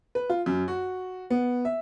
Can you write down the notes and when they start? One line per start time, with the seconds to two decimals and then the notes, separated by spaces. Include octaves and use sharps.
0.15 B4
0.30 F4
0.46 F#2
0.68 F#4
1.30 B3
1.65 E5